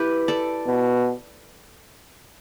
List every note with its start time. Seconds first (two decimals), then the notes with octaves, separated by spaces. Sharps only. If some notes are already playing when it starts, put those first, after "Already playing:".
Already playing: E4 G4 B4
0.28 A4 D5
0.67 B2